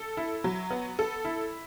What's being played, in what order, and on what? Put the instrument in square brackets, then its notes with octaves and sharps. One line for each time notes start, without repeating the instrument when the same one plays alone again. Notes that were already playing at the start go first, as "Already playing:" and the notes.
Already playing: [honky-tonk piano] A4
E4
F#3
B3
A4
E4